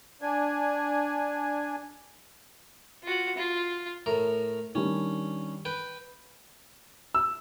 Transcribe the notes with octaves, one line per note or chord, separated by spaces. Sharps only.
D4 G#5
F4 F#4
F4
A2 A#4
D#3 G3 C#4 D4
B4 G5
E6